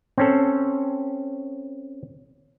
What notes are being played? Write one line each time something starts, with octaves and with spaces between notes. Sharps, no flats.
C4 C#4 A4